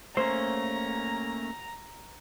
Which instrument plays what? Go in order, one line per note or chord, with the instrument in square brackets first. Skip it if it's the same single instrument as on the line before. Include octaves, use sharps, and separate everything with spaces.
[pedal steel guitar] A3 A#3 C#4 [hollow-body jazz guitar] C5 [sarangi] A#5